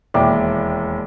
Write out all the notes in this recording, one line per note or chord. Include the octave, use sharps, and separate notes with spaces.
E1 D#2 E4 D5 D6